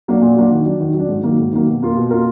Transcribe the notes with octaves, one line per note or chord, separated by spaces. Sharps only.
F#3 A#3 D4 F#4
A#2
F#3 A#3 D4 F#4
D#3
F#3 D4
D#3
F#3
D4
G#2
D#3 F#3 A#3
G#2
D#3 F#3 A#3
B2
A#3 F4 A#4
B2
A#3 F4 A#4